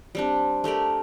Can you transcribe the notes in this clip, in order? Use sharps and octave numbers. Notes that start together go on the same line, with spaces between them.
G3 C4 D4
A3 G4 A#4 D5